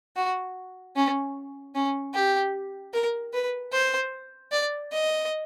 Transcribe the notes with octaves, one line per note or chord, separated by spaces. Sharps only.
F#4
C#4
C#4
G4
A#4
B4
C5
D5
D#5